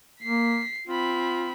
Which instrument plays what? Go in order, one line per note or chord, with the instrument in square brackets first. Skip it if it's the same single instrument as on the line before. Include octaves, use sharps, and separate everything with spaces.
[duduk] A#3 [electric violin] B6 C7
[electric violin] C4 B5 [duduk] F4